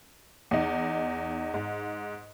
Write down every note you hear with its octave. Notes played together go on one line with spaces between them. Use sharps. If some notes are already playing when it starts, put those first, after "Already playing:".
E2 D#4
G#2